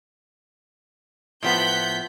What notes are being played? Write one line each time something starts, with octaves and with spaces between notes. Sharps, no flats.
A2 F3 B3 F#5 G6 B6